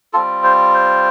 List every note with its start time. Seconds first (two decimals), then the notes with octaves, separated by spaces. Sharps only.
0.13 G3 C4 F4 A4
0.44 C5
0.74 C5